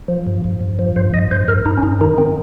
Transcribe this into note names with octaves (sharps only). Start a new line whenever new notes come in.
F3
G2
G2
G2
F3
G2 C5
G2 D#5
G2 C5
G2 A#4
G2 D#4
C#4
G2 D#4
D#3 D#4
D#3 C4